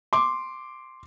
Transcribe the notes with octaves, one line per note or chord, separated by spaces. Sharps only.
C6 D6